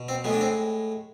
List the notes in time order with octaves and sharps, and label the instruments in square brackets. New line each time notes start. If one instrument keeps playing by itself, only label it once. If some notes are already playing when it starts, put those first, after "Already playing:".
Already playing: [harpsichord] B2
C4
A2 G#3 B3
D4
C4